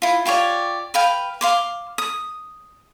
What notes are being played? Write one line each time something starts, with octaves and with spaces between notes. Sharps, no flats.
E4 F4
F4 G4 C#5 D5
B4 F5 G5
F5 C6 D6
D#6